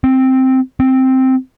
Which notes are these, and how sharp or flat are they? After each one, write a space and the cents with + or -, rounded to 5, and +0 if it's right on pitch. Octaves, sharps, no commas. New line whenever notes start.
C4 +0
C4 +0